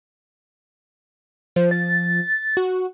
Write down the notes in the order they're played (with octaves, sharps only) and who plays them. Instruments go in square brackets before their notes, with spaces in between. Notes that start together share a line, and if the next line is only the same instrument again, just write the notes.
[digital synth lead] F3 [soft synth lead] C5
[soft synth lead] A6
[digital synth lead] F#4